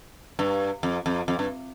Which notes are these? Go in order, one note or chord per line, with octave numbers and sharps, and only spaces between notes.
G2
F2
F2
F2
G2